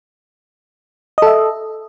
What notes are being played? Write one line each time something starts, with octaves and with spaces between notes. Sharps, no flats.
A4 D#5 E5